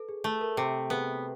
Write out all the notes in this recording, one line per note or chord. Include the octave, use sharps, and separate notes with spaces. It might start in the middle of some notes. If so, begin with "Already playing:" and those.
Already playing: A4 B4
G#4
A3
A#4
C3 A4
B3 G#4